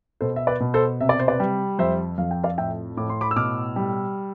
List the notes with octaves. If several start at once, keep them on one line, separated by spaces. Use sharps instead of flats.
B2 A4 C5
E5
B4 D5
B2
A4 C5
C3 E5
D5
C5
B4 D5
G3
F2 C5 E5
F2 F5
G5
D5 F5
A2 E5 G5
A2 D6
C6
B5 D6
E6
B2 D6 F6
G3